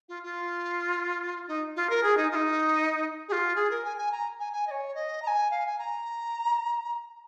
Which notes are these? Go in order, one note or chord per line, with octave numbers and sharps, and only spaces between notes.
F4
F4
D#4
F4
A#4
G#4
D#4
F4
D#4
G#4
F4
G#4
A#4
G#5
G#5
A#5
G#5
G#5
D#5
C#5
D#5
A#5
G#5
F5
G#5
A#5